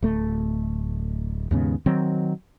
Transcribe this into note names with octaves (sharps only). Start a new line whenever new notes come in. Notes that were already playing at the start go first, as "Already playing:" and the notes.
D1 A3
D#2 G#2 C#3 B3
D#3 F#3 C4